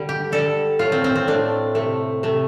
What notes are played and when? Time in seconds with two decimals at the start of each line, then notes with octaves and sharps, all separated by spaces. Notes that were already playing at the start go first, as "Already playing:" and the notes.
Already playing: D3 G3
0.09 G4
0.32 D3 G3 A4
0.79 A2 A3 F4
0.92 C4
1.04 C4
1.15 C4
1.28 A2 A3 D4
1.75 C3 A3
2.23 C3 A3